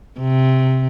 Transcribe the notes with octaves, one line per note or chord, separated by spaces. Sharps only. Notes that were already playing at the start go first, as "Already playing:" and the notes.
C3